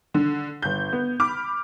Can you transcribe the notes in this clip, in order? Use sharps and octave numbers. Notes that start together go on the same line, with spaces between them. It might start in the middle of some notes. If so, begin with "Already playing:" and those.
D3
G1 G6
B3
B5 D6 F6